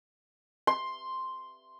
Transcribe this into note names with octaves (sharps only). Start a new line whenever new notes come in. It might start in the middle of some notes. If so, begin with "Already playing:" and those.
C6